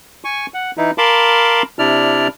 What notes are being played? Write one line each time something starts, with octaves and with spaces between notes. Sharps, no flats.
G#5 C#6
F#5
E3 D#4 E4
A#4 F5 A5 B5 C6 D6
C3 D4 E4 D5 F6